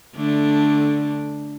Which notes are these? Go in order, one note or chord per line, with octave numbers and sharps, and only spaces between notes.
D3 A3 D4